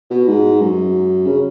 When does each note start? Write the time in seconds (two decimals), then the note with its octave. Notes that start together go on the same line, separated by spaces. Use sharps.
0.11 B2
0.27 G#2
0.60 F#2
1.26 C#3